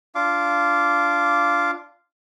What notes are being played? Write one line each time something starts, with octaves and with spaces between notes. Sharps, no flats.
D4 F4 F5 D6